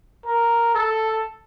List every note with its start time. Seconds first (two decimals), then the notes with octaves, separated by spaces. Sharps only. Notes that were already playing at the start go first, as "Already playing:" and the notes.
0.25 A#4
0.74 A4